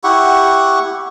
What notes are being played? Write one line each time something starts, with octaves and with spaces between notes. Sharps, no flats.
E4 G4 F#5 C#6